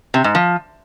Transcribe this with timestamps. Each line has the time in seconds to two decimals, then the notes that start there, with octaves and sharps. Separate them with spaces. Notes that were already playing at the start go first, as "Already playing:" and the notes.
0.14 C3
0.24 G#2
0.35 F3